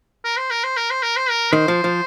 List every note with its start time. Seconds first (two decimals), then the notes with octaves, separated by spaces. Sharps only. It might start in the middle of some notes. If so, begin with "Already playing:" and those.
0.24 A#4
0.37 C5
0.50 A#4
0.64 C5
0.77 A#4
0.90 C5
1.03 A#4
1.16 C5
1.30 A#4
1.52 D#3 C5
1.68 F3
1.84 F3